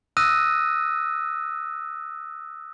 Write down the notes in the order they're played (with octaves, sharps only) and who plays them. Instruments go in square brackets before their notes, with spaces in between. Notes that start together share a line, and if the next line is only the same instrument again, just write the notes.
[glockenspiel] D#6 E6 F#6 A#6 D#7